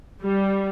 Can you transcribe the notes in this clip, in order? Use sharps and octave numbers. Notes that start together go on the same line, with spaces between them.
G3